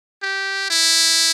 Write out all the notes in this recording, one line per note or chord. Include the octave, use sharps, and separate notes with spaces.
G4
E4